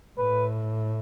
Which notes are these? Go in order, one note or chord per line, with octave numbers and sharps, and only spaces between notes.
A2 B4